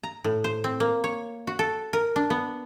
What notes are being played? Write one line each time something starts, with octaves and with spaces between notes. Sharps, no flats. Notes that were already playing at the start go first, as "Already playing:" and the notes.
A#5
A2
C5
C4
A#3
C#5
F#4
A4
A#4
D4
B3